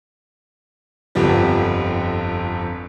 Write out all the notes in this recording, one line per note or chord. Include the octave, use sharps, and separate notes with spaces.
G1 F2 D3 F3 G3